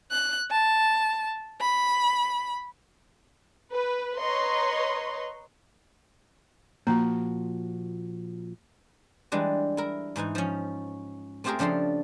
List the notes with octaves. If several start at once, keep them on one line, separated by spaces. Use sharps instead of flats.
F#6
A5
B5
B4
B4 C#5 D#5 A#5 C6 C#6
A#2 F3 A#3 F#4 A#5
E3 G3 G#3 D4
E4 A#4
G#2 E3 D#4 G#5
F3 C#4
A3 C4 F4 G4 G#4 A#4
C#3 F3 D4 A4 C6